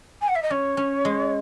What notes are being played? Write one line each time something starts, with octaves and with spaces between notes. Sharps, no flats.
G#5
F#5
E5
D#5
C#4 C#5
C#4
G#3